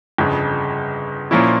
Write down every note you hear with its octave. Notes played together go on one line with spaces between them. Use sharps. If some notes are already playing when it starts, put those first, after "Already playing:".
G1 F2 C#3
A#2 F3 A#3 C#4 E4